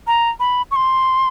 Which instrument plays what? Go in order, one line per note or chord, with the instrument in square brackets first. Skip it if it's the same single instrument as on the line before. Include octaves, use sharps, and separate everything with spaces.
[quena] A#5
B5
C#6
C6